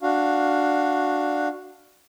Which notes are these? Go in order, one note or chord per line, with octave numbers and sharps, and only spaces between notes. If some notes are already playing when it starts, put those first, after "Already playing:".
D4 F#4 F5